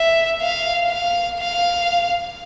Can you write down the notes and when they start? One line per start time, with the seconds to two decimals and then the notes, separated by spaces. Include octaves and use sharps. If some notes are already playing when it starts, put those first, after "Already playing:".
Already playing: E5
0.42 F5
0.90 F5
1.39 F5